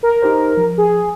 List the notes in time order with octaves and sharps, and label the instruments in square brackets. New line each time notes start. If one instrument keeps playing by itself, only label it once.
[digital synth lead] A#4
[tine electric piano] D#4 G4 C5
F3
[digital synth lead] G#4